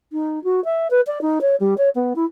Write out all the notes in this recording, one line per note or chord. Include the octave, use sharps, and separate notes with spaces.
D#4
F#4
E5
B4
D5
D#4
C#5
G3
C#5
B3
E4